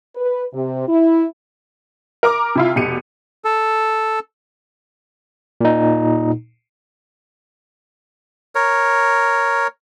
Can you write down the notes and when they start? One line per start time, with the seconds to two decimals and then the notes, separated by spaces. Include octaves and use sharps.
0.16 B4
0.53 C3
0.87 E4
2.23 A#4 A#5 D6
2.56 C3 E4 F4
2.75 F1 B2 G4 C#7 D#7
3.45 A4
5.61 A#2 D#4
8.55 A#4 C#5